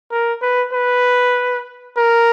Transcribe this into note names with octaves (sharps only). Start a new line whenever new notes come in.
A#4
B4
B4
A#4